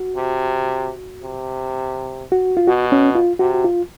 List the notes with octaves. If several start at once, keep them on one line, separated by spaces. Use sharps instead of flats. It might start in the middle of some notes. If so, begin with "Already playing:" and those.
Already playing: F#4
C3
C3
F#4
F4
B2 F#4
C#4
F4
C3 F#4
F#4
F4